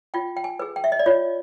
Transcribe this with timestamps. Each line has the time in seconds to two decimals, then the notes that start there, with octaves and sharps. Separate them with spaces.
0.14 F4 G5
0.37 G5
0.44 G#5
0.59 G#4 B4
0.76 G5
0.84 E5
0.92 D#5
0.99 D5
1.06 F4 C#5